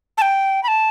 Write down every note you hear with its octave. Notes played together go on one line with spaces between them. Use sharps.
A5
G5
B5
A5